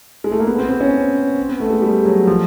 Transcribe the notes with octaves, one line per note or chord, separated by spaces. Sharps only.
G#3
A3
A#3
B3
C4
C4
C#4
B3
A3
G#3
G3
F#3
F3